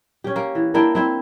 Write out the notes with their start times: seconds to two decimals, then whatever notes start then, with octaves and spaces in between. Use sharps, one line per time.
0.24 C#4 G4
0.36 A#3
0.55 E3
0.74 A#3 D4 E4 G5
0.95 C4 E4 C5